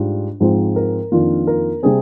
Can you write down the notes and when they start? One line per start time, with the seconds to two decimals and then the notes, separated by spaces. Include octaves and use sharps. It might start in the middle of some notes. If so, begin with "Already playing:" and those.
Already playing: G#2 G3 D4 F4
0.40 G#2 F3 G#3 C4
0.76 A#4
1.12 F2 D#3 A#3 D4 F4
1.47 A#4
1.83 C3 G3 C4 G#4